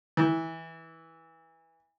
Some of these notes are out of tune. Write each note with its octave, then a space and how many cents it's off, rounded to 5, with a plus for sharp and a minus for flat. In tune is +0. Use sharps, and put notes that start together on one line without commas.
E3 -15